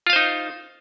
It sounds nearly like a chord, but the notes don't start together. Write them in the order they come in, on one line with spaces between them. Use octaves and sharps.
F4 F5 C5 D#4